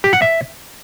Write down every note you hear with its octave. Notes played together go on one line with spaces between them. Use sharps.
G4
F#5
E5